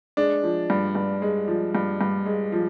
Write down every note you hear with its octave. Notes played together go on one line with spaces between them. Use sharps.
G#3 D4
F3
G2
G2
G#3
F3
G2
G2
G#3
F3